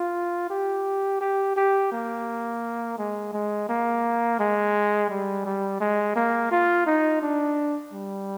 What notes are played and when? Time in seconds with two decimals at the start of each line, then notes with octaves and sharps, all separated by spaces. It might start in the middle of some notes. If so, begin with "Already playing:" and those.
Already playing: F4
0.50 G4
1.21 G4
1.56 G4
1.92 A#3
2.98 G#3
3.33 G#3
3.69 A#3
4.39 G#3
5.09 G3
5.45 G3
5.80 G#3
6.16 A#3
6.51 F4
6.86 D#4
7.22 D4
7.93 G3